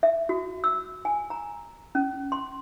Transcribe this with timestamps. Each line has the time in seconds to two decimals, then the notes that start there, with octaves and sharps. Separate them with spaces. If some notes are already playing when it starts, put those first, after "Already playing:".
0.03 E5
0.29 F#4
0.64 E6
1.05 G#5
1.30 A#5
1.95 C#4
2.32 C6